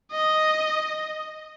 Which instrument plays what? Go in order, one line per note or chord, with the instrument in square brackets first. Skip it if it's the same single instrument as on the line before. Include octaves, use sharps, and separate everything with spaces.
[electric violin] D#5